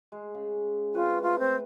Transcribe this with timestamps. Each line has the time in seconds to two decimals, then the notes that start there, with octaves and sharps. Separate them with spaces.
0.12 G#3
0.35 C#3
0.94 C4 F4 B4 C#5
1.22 A3 F4
1.39 C4